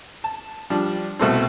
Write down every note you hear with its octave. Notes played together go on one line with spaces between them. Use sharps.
A5
F3 G3 D4
C2 B2 A3 C4